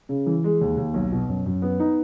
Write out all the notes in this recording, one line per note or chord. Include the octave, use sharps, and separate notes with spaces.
C#3
E3
G#3
D#2
D#2
B1
B2
F#2
F#2
B3
D#4